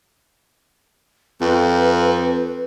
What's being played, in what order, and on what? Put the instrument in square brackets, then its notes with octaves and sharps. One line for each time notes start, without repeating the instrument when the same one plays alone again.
[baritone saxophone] F2 [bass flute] B4